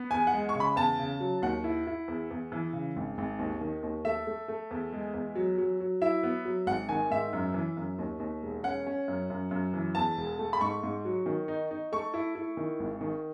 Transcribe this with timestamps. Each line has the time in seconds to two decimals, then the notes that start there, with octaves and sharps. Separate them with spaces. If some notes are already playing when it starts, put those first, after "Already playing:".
Already playing: B3
0.11 E2 G#5
0.27 F#5
0.33 G#3
0.49 C#6
0.55 C#3 B5
0.76 E2 A5
0.99 C#3
1.20 F#3
1.42 D#2 F#5
1.64 E4
1.87 E4
2.08 E2
2.31 E2
2.52 E3
2.73 C#3
2.96 G#1
3.18 G#1
3.39 D#2
3.61 D#3
3.83 D#2
4.05 A3 E5
4.27 A3
4.48 A3
4.71 E2
4.93 G#3
5.14 E2
5.36 F#3
5.58 F#3
5.80 F#3
6.02 E4 E5
6.23 B3
6.45 F#3
6.67 G#1 F#5
6.89 D#3 G#5
7.11 G#2 E5
7.33 F#2
7.54 E3
7.77 F#2
7.99 D#2
8.20 D#2
8.43 E1
8.63 C#4 F#5
8.87 C#4
9.08 F#2
9.30 F#2
9.51 F#2
9.74 E3
9.95 E2 A5
10.17 E1
10.39 A3
10.53 B5
10.61 G#2 C#6
10.83 G#2
11.05 F#3
11.26 D#3
11.48 D#4
11.71 D#4
11.92 A3 C#6
12.14 E4
12.35 E4
12.57 D#3
12.80 G#1
13.01 D#3